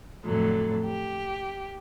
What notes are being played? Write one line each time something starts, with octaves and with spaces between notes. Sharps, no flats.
F2 A2 D3 F#3
G4